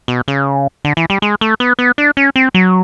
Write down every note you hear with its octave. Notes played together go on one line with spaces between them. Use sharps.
B2
C#3
D3
E3
G3
G#3
A3
B3
B3
D4
C#4
C4
F#3